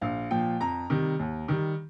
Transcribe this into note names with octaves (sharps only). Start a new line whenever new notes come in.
A#1 F5
A#2 F3 G5
F2 A#5
C3 D#3 G3
D#2
D#3 G3